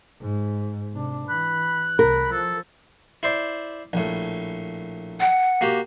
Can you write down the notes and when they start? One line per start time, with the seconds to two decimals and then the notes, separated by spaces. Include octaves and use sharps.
0.21 G#2
0.93 C3 D4
1.29 E3 B5 F#6
1.99 C2 A#4 B5
2.32 F3 A4
3.23 E4 C5 D5
3.93 A#1 A2
5.20 F#5
5.61 A#3 F#4 G4